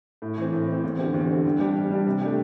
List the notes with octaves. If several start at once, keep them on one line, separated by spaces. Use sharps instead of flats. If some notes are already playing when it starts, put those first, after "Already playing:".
A2
E3 C4
A2
E3 C4
E2
D3 C4 G4
E2
D3 C4 G4
G2
G3 D4 G4
G2
G3 D4 G4
C3
A3 D4 G4